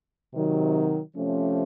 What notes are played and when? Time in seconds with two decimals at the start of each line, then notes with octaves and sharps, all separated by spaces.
0.33 C3 D#3 F#3
1.16 C3 F3 A3 C#4